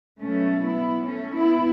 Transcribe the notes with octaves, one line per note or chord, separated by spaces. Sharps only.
B2 F#3 A3 C#4
B3 E4
A3 C#4
B3 E4